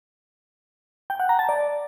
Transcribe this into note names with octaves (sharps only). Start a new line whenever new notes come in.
G5
F#5
A#5
A5
D5